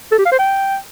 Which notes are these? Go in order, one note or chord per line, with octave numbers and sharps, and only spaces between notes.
A4
G4
F5
C5
G5